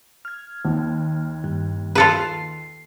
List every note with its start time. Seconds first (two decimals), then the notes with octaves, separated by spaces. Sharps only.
0.25 F6 G#6
0.65 D#2
1.44 G2
1.95 F4 A4 B4
2.20 C7